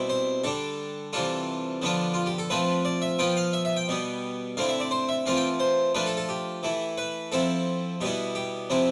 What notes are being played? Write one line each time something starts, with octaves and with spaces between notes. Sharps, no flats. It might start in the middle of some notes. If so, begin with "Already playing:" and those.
Already playing: B2 G3 C4 E4
C5
D3 G3 D4 A4
C3 E3 G3 D4 F4 A4
D3 F3 B3 D4 F4
F4
G4
A4
F3 A3 C4 F4 B4
D5
E5
F3 B3 F4 G5
F5
E5
E5
G5
B2 G3 B3
D3 A3 C4 E4 F5
E5
D5
C5
E5
E3 A3 C4 F4 F5
G5
C5
F3 A3 D4 F4 B4
A4
A4
G4
E3 A3 E4
B4
F3 C4 E4 A4
B2 G3 B3 E4 G4
G4
C3 F3 C4 E4